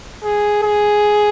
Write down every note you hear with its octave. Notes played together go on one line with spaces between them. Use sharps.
G#4
G#4